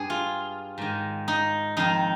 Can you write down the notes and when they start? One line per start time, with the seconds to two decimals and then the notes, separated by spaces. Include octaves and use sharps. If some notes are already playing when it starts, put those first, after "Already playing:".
Already playing: G2 G#4
0.10 F4
0.78 G#2 D#3
1.28 D#4
1.77 F2 D#3 D#4